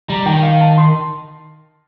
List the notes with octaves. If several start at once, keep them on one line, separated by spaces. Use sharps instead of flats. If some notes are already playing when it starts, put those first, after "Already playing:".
G3 A#5
D#3 G5
F5
A5
C6